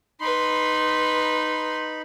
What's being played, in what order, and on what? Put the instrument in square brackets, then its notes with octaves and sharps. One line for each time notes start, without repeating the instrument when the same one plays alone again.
[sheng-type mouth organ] D#4 B5 [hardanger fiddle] B4 C6